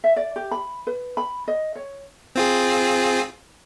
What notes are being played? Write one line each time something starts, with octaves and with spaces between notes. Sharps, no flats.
E5
D5
G4
B5
B4
B5
D#5
C#5
C4 F4 G#4